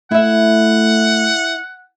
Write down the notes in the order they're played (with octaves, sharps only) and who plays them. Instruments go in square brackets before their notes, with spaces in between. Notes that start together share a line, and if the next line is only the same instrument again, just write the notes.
[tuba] A3 [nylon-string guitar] E4 E5 [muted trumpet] F#5